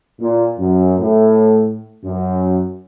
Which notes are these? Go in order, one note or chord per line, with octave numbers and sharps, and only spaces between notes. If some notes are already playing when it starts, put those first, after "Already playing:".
A#2
F#2
A2
F#2